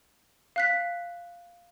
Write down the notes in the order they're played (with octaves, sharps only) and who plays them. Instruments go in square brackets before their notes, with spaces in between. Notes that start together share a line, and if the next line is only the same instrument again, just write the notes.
[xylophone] F5 F#6 B6